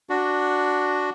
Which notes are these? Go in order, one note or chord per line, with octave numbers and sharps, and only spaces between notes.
D4 F#4